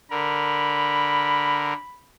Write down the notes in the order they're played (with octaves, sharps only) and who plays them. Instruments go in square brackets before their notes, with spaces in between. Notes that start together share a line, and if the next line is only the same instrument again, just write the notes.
[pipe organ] D3 A#4 [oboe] B5